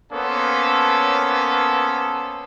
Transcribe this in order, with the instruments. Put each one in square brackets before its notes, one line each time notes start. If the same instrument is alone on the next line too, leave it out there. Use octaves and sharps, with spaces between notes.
[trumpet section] A#3 B3 C#4 A4 A#4 C5